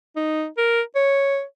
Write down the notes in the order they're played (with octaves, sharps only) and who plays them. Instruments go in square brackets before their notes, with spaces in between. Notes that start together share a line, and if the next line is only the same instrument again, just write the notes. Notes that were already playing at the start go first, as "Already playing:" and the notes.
[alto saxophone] D#4
A#4
C#5